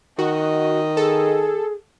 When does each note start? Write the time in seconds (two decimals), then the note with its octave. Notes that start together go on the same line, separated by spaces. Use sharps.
0.19 D#3 F#4 D#5
0.97 G#4 A4